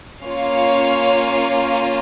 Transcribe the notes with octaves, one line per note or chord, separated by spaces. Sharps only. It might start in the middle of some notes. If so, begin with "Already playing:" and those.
A#3 C#4 F4 C#5 F5